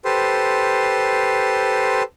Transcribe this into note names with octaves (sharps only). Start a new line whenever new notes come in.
G4 A4 B4 C5 C6